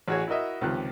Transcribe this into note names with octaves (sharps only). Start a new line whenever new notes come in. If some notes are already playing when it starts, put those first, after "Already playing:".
A1 F#4 G#4 C#5
E4 F#4 A#4 D#5 E5
C#2 C3 D#3 F3 G4 F#6